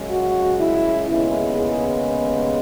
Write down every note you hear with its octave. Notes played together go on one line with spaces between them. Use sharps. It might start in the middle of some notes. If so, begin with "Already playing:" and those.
Already playing: F#2 C#3 G#3
F#4
E4
D#2 C#3 G#3 B3 E4
G#4